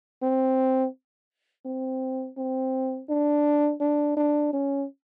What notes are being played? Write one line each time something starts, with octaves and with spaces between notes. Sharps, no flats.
C4
C4
C4
D4
D4
D4
C#4